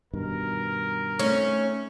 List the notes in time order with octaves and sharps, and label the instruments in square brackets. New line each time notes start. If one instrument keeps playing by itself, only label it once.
[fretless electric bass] G2 B2 D#3 [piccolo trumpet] A#4
[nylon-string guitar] A3 C4 D#4 [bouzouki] C#4